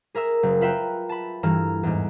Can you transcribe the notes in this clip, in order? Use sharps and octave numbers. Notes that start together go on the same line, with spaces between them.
G#4 A#4 E5 E6
F#1
F4 B4 E5 G5 A#5
A5 B5
G2 E3 A4 A#5 F6
E2 G#2